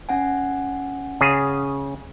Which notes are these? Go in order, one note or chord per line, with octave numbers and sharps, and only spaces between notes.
C#4 F#5 G#5
C#3 G#4